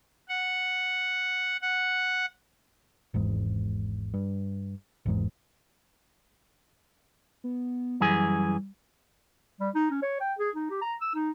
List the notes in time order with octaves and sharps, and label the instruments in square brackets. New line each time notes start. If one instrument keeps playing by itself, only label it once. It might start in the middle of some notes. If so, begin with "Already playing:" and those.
[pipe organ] F#5
F#5
[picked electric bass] G#1 E2 G#2
G2
G#1 E2 G#2
[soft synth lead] B3
[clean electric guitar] F#2 E3 G#4 [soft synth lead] G3
[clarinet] G3
D#4
C#4
C#5
G5
G#4
D#4
G4
A#5
E6
D#4